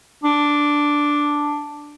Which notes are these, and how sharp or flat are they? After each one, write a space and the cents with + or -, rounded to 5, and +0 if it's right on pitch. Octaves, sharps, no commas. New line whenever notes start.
D4 +0